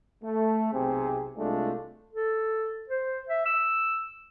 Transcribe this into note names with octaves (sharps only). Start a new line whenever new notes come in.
A3
B1 C3 C4 G#4
C2 G#3 A3 D4 F4
A4
C5
E5
E6